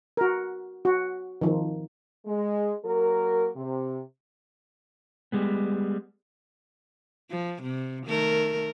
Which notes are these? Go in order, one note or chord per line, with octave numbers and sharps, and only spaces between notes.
F#4 A#4
F#4
D#3 F3
G#3
F#3 A#3 A#4
C3
G3 G#3 B3
F3
C3
D#3 A3 A#4